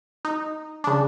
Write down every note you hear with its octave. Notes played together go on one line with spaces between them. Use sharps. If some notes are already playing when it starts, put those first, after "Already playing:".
D#4
C#3 D4